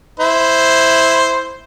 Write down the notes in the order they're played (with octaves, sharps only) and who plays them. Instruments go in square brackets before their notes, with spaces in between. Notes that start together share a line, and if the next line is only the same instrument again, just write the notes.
[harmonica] E4 C5